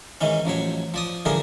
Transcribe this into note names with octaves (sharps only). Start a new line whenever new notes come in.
G#2 D#3 E3 C#4
A1 F3 F#3 C#5
F3 D5 D#6
D3 E3 F3 G3 G#4 A#4